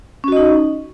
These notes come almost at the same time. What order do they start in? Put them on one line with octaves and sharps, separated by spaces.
C#4 F#4 D#5 D#4